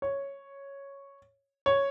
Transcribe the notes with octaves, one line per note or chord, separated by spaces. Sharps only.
C#5
C#5